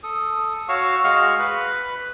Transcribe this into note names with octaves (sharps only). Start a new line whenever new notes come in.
A4 D#6
F#4 C#5 F5 C#6 E6
G#3 F#4 D#5 F5 C#6 F6
B4 B5